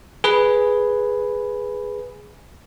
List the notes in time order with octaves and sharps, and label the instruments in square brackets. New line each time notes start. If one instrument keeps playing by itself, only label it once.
[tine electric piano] G#4 B4